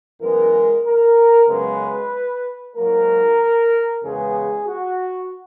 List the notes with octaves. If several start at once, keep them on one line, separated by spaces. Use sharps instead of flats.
F#2 E3 G#3 B3 A#4
A#4
F#2 C#3 G#3 B3 B4
G#2 F#3 A#3 A#4
E2 C#3 G#3 B3 G#4
F#4